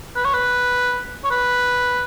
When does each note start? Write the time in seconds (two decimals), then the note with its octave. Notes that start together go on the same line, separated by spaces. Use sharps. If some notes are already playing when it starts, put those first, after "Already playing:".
0.16 B4
0.25 C#5
0.34 B4
1.24 C#5
1.30 B4